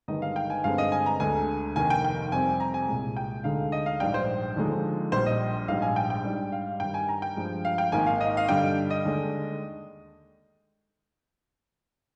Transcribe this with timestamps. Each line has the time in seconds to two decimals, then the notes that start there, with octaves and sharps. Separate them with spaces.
0.08 G1 G2 D#3 G#3 D#4 D#5
0.22 F5
0.36 G5
0.50 G#5
0.64 G1 G2 D3 G#3 C4 F5
0.78 D#5
0.92 G#5
1.06 A#5
1.20 D2 D3 G#3 G#5
1.76 F1 D#2 D#3 A#3 G#5
1.90 G5
2.05 G5
2.32 F2 C3 G3 C4 G#5
2.60 A#5
2.74 G#5
2.88 C2 A#2 G#3
3.16 G5
3.44 D2 D3 G#3 D#4 F5
3.72 D#5
3.86 F5
4.00 A#1 G#2 G3 D4 G5
4.14 C5
4.56 D#2 D3 F3 G#3 D#4
5.12 A#1 A#2 G3 C5
5.26 D#5
5.68 A#1 G#2 G3 F5
5.82 G#5
5.96 G5
6.10 G5
6.24 G#2 G3 D4
6.52 F5
6.80 G2 D#3 G3 G5
6.94 G#5
7.08 A#5
7.22 G5
7.36 G2 F3 G#3
7.65 F5
7.78 G5
7.92 G#1 G#2 D#3 A#3 G#5
8.07 F5
8.20 D#5
8.37 F5
8.48 G2 D3 G3 D4 G5
8.90 D#5
9.04 D#2 D3 G#3 D4